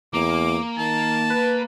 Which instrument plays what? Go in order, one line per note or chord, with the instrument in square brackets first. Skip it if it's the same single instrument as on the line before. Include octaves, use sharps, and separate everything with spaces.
[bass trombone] E2 [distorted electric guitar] A#3 [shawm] D6
[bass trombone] D#3 [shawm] A5
[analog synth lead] B4